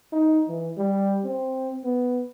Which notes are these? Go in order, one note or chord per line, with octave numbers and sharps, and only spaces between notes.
D#4
E3
G3
C4
B3